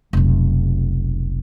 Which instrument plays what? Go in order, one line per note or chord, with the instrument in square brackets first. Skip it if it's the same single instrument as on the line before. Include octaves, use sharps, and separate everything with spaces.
[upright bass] F1 B1